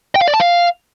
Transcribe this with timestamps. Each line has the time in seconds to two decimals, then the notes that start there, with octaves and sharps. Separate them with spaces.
0.15 G5
0.22 F5
0.28 D5
0.34 A5
0.40 F5